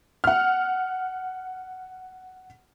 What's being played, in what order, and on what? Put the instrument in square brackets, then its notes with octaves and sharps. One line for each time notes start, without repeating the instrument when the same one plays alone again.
[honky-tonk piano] F#5 F6